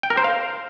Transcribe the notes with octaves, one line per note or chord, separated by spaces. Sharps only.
G5
A#4
C5
F5